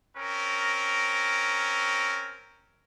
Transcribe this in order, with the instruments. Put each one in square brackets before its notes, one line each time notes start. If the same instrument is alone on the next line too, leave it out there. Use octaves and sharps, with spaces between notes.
[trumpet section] C4 C#4 A#4